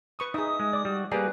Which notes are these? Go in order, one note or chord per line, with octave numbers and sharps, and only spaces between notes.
B4 C#6 D#6
D#4 G#4 D#5 E5 D#6
G#3
D5 D6
G3 F#4
G3 A#3 G4 G#4 B4 D5 G5 A#5